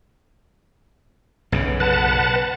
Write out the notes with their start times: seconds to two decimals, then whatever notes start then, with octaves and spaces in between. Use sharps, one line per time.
1.52 B1 F#2 C#3
1.80 B4 F#5 A5